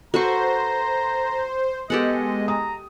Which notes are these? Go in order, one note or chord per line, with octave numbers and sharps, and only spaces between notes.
F#4 A4 B4 C5 A#5 C#6
G#3 B3 G4 A4 D#5 F#5
A#5 D#6